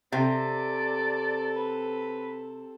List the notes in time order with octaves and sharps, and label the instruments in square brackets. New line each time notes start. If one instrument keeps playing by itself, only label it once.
[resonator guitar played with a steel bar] C3 [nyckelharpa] C4 A4 [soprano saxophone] D5
[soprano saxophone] B4